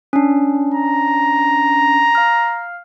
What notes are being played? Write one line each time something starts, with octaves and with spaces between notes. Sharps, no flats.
C#4 D4
A#5
F5 F6